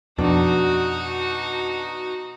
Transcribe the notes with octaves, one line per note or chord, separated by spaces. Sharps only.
F2 B2 D4 D#4 F#4